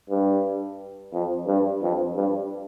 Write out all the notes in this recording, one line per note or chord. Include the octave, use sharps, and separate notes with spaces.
G2
F2
G2
F2
G2